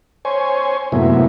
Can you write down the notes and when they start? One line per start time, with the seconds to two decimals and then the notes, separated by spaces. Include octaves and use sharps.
0.25 C5 C#5 G#5
0.92 F#2 A2 C3 A#3 B3 E4